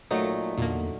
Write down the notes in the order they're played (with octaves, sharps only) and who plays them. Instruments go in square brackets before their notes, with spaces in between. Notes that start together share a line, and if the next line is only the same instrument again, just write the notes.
[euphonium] A#2 [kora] F#3 A3 D#4
[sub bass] E2 [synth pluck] A#2 A#3 [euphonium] D3